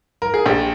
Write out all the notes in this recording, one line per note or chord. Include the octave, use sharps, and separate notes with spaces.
A#4
G#4
A#1 G4